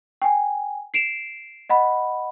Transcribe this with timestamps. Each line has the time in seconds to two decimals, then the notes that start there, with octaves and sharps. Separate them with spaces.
0.22 G5 G#5
0.94 C7 D7 E7 F7
1.70 D#5 F#5 B5